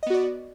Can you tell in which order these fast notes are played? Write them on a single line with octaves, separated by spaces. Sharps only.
D#5 B3 F#4 D5